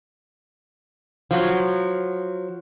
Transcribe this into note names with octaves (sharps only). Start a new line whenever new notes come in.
F3 F#3